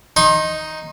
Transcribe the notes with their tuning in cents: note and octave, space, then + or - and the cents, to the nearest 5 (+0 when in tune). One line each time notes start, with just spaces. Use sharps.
D#4 +0 C6 +40